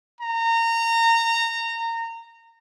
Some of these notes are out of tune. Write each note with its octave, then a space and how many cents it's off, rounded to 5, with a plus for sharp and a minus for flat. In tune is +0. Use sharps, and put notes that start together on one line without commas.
A#5 -25